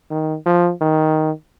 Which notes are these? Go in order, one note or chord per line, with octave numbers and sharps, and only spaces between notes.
D#3
F3
D#3